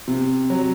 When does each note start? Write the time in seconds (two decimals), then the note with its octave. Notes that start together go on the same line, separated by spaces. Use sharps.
0.08 C3
0.50 F#3